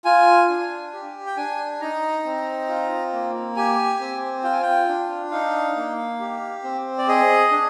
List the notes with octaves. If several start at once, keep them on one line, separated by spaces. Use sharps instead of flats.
F4 G#5
D4
G4
G5
D4 G#5
D#4 A#5
C4
F4
A#3
G4 G#5
C4
F4 G5
G#5
G5
D4
D#4 F5
A#3
G4
C4
D5
G#4 D#5
D4